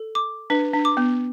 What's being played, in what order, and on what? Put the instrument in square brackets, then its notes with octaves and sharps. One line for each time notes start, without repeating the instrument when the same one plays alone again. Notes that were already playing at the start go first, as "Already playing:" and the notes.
Already playing: [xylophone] A4
D6
[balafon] D4 [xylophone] B4
[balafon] D4
[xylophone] D6
[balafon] B3